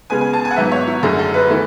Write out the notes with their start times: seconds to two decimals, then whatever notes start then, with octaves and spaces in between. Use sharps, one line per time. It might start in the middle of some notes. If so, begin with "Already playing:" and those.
0.10 C#3 G#3 B3 G#5
0.21 G#5
0.33 A5
0.45 G#5
0.51 F#5
0.56 G#2 F#3 B3 E5
0.72 C#5
0.87 E4
1.03 F#2 D3 A3 G#4
1.19 A4
1.34 B4
1.50 E3 A3